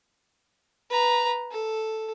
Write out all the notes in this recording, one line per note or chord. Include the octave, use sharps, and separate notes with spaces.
B4 A#5
A4